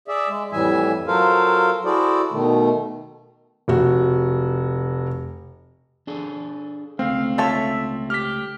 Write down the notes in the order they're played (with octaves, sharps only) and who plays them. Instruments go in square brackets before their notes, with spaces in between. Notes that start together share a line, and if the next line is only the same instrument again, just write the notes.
[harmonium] G#4 D5 E5
G#3
F2 A2 E3 G3 E5 G#5
F#3 F4 A4 A#4 C5 F5
E4 F#4 G#4 A4 C5 D5
B2 D#3 A3
[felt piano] F1 F#4
[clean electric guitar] D4 G#4 A4
[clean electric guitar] C#2 A3 [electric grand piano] C4 [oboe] F5
[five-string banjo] F4 A4 C#5 [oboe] E5
[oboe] G4 [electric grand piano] F6 B6